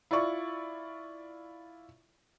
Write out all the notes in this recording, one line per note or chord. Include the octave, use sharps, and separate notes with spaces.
E4 F4 D5 C#6